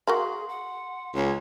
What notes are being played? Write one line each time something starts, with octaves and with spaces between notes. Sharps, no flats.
F#4 G#4 A#4 F5 C6
F#5
C#2 C#5